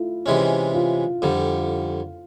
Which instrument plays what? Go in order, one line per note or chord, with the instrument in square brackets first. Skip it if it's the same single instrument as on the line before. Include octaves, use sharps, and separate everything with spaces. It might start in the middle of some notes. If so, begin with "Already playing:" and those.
Already playing: [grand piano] A3 E4 F4
[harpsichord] C3 E3 G#3 C#4
[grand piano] F4
[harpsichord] F2 D3 G3